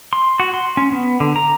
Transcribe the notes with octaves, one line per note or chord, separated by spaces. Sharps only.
C6
F#4
C6
C#4
B3
D3
A#5